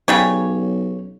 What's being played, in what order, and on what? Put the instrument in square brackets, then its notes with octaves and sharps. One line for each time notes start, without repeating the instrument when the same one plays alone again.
[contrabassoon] B1 [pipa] C#3 G3 C#5